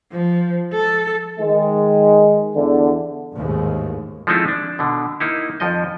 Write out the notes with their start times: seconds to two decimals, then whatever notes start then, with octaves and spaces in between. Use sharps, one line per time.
0.12 F3
0.73 A4
1.40 D#3 G#3
2.55 E2 D3
3.34 A1 D#2 G#2
4.27 F3 G#3 A3 C4 D#4 E4
4.48 D4
4.79 B2 D3
5.20 A#3 D#4 E4
5.60 F2 F3 D#5